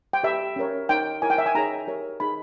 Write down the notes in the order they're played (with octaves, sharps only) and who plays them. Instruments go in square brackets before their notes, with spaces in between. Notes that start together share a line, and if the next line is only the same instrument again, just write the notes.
[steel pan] G5
G4 B4 E5
C#4 G4 A#4 C#5
D#4 A#4 C#5 G5
E4 A#4 C#5 G#5
G5
E5
G#5
D#4 G#4 C#5 A#5
G4 A#4 C#5
D#4 G#4 B4 B5